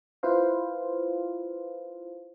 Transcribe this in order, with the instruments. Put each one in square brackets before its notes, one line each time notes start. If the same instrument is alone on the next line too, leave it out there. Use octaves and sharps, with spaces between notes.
[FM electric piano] E4 F4 B4 C5 F5